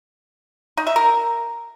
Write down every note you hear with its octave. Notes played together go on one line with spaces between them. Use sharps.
D#4
E5
A#4